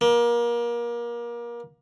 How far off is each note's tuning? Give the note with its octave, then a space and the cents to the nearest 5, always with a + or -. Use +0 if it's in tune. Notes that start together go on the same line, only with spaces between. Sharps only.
A#3 +30